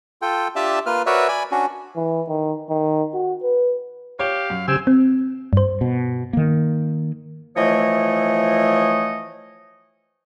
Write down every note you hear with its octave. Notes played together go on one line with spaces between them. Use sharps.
F4 A4 G5
D4 F4 G4 D5 E5 A5
A#3 F4 B4 F6
F#4 A#4 B4 C#5 D5 E5
D5 G#5 B5
C#4 D4 F#4
E3
D#3
D#3
F#4
B4
G4 C#5 F5
F#2
C#3 C4 G4 G#5 E6
C4
G2 C5
B2
D#3 A#3
E3 F3 A3 C#5 D#5